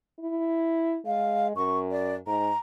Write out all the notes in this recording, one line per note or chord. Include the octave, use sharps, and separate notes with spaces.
E4
G#3 F5
F#2 C#6
D5
G#2 A#5